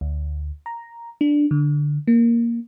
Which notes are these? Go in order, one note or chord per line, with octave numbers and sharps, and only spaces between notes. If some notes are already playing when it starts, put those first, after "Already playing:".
D2
A#5
D4
D3
A#3